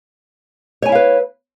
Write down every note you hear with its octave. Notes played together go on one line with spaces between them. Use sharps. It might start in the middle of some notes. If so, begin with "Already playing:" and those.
E4 B4 C#5 F5 G#5